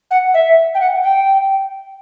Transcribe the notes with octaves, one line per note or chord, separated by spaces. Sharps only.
F#5
E5
G5
F#5
G5